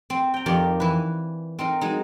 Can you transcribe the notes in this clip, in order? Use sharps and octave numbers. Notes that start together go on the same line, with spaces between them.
C4
G5 A#5
F2 D#3 G4 A#4 D5
E3 B4
C4 D#4 A#4
F#3 G#3 D#4